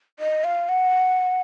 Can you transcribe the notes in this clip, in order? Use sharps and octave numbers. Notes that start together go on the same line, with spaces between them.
D#5
F5
F#5